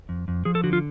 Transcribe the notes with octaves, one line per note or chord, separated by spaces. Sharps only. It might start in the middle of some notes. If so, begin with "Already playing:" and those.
F2
F2
F3 G#4
A4
D3 F#4
F4